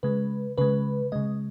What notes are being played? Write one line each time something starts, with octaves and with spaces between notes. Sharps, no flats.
C#3 G#3 B4
C#3 G#3 B4
C#3 G#3 D#5